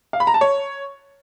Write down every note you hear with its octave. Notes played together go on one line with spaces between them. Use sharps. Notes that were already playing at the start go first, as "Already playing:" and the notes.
F5
B5
A#5
A5
C#5